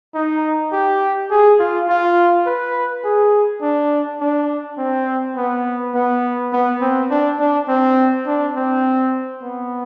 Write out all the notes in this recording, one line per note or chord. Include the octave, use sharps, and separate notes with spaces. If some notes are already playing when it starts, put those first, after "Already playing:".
D#4
G4
G#4
F4
F4
B4
G#4
D4
D4
C4
B3
B3
B3
C4
D4
D4
C4
D4
C4
B3